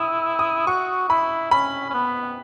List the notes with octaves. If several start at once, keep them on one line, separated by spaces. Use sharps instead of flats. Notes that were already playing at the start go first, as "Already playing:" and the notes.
Already playing: E4 D#6 E6
D#6
F#4 C#6
E4 B5
C#4 B5
C#4
B3